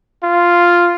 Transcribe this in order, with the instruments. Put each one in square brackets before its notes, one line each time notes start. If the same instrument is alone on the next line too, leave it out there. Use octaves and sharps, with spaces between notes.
[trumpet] F4